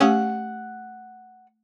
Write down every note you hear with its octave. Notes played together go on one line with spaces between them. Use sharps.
A3 C#4 G4 F#5 G#5